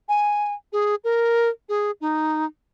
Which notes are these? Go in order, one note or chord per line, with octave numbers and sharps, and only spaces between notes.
G#5
G#4
A#4
G#4
D#4